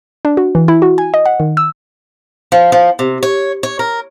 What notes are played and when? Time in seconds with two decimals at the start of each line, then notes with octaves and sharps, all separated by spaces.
0.25 D4
0.37 F#4
0.55 E3
0.68 E4
0.82 F#4
0.98 G#5
1.14 D#5
1.26 F#5
1.40 D#3
1.57 E6
2.52 F3
2.72 F3
2.99 C3
3.23 C#5
3.63 C#5
3.79 A#4